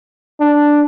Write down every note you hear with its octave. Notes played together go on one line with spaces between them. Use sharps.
D4